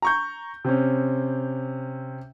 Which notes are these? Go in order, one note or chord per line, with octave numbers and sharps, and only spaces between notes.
A#5 C#6 G6
C3 C4 C#4